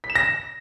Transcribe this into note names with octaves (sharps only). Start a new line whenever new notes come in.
B6
E7
A#6